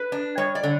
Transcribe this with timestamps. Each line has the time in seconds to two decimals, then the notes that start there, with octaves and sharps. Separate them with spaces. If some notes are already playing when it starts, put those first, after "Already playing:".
Already playing: B4
0.12 D4
0.38 G3 C#5
0.55 D5
0.63 D3